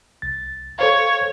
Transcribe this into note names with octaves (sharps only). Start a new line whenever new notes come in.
C2 A6
A4 C5 C#5 F5